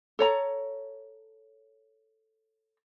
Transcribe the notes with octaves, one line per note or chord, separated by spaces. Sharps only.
A4 C#5 A#5